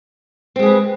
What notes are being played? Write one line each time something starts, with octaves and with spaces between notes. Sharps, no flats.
G#3 C4 G#4 B4